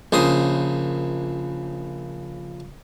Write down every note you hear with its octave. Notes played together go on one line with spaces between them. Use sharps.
A#1 C#3 C5 D#6